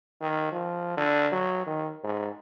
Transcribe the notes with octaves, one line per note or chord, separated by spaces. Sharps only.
D#3
F3
D3
F#3
D#3
G#2